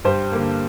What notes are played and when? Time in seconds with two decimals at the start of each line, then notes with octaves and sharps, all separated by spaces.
0.04 G2 G4 C5
0.32 D3 A#3